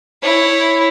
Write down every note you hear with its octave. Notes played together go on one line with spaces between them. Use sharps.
E4 C#5